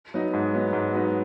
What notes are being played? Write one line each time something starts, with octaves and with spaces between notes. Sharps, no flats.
F#3 B3 D#4
G#2
F#3 B3 D#4
G#2
F#3 B3 D#4